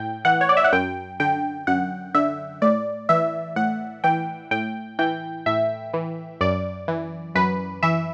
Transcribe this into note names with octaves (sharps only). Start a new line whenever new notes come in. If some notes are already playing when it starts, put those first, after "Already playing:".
Already playing: A2 G5
E3 F#5
C#5
D5
E5
F#5
F#2 G5
D3 G5
F#2 F#5
D3 E5
A2 D5
E3 E5
A2 F#5
E3 G5
A2 G5
E3 G5
A2 E5
E3
F#2 D5
E3
F#2 B4
E3 E5